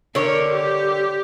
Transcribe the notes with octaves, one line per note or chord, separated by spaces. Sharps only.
D3 A#4 C#5
G4